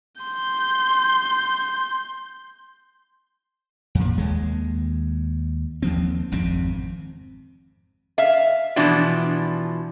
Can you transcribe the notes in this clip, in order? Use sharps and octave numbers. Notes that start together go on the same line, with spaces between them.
C6 G6
F2 A#2
D#2 G#3
D#2 F3 C4
G#1 F2 C3 C4
E5 F5
B2 E3 F3 D4